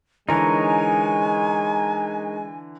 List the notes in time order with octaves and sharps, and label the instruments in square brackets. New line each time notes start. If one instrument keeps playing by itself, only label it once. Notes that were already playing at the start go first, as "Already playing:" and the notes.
[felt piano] D3 E3 [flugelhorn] G#3 [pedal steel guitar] D#4 A#4 C#5 [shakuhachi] G#5